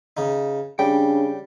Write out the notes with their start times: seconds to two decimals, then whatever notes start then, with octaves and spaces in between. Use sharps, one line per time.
0.17 C#3 D#4
0.79 C#3 G3 D4 G5